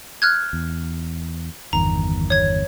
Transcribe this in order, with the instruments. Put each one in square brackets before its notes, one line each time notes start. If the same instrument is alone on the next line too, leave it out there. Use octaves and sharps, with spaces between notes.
[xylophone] F6 F#6 G#6
[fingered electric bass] E2
[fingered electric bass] G1 E2 D#3 [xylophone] A#5
[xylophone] C#5 G#6